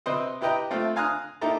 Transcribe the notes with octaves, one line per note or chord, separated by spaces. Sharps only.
C3 C4 B4 C5 D#5
E4 G4 B4 D#5 G5 A#5
A3 C4 F4
F5 G#5 A#5 D#6 F#6
A#3 D#4 E4 G4 A4 A#5